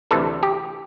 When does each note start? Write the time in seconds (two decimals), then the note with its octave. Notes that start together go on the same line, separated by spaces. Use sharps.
0.11 D2 C3 E3 A4
0.43 G4